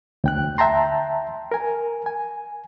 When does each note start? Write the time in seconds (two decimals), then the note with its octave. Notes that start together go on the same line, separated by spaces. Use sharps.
0.24 D2 G5 F#6
0.58 E5 G5 A5 A#5 C6
1.51 A#4 G#5
2.06 G#5